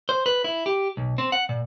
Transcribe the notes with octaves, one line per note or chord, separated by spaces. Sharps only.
C5
B4
E4
G4
B1
C4
F#5
A#2